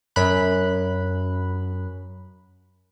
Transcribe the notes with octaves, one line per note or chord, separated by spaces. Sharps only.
F#2 B5 F#6